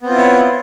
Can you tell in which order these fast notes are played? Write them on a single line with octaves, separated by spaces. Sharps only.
B3 C4 F4 E4 C#5